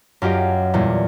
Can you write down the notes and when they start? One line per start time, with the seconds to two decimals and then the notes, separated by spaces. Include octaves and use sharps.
0.22 F#2 F4 G4 D#5 D7
0.74 E2 A#2 G3